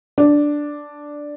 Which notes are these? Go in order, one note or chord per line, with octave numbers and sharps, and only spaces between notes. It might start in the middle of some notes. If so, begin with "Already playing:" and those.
D4